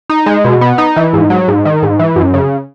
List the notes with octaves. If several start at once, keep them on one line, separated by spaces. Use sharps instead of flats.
D#4
G#3
B2
B3
D#4
E3
G#2
F#3
G#2
D#3
G#2
E3
F#2
C#3